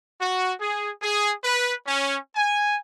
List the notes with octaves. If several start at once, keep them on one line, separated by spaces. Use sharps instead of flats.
F#4
G#4
G#4
B4
C#4
G#5